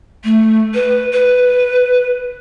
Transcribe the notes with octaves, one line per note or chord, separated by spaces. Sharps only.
A3
B4
B4